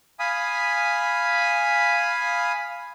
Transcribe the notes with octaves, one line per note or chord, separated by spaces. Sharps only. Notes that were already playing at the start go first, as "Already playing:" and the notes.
F5 G#5 B5 D#6